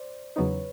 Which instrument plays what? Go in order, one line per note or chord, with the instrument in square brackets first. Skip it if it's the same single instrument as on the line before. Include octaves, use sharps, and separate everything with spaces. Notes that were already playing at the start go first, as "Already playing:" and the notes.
Already playing: [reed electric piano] C5 D5
[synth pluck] E2 C#3 F#3 B3 D#4 [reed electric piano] B4 C#5